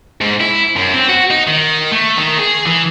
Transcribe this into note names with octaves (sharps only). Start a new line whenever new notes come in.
G#2
E4
F#2
C4
F#4
D#4
D#3
A3
D#3
G#4
E3